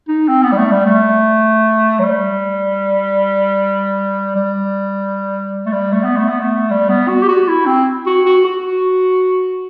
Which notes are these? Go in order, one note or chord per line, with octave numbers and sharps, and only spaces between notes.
D#4
C4
B3
G3
A3
G3
A3
F#3
G3
G3
A3
G3
A3
B3
A3
B3
A3
G3
B3
F#4
G4
F#4
E4
C4
F#4
F#4
F#4